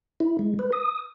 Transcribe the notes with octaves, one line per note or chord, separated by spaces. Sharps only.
E4
G#3
B4
D#6